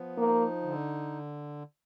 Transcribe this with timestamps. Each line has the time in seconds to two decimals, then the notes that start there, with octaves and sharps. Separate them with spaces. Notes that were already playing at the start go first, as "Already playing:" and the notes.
Already playing: F3 B3
0.18 A#3 D#4
0.62 D3